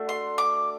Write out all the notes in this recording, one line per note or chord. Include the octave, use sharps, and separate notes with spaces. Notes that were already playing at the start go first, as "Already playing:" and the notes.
Already playing: A3 D4 F#4
C6
D6